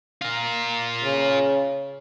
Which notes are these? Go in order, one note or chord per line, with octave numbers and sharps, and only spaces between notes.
F4 A#4
C#3